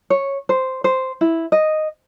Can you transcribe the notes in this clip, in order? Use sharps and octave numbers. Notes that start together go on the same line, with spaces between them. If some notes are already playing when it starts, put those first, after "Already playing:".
C#5
C5
C5
E4
D#5